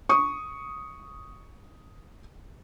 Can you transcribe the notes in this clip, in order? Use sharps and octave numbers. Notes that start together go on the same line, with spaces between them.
C#6 D#6